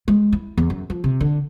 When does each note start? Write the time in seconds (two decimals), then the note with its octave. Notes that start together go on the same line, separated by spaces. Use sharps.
0.08 G#3
0.33 E4
0.58 E2
0.70 F#2
0.90 F3
1.04 C3
1.21 D3